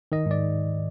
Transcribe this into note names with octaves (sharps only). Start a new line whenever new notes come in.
D#3 D#5
G#2 D5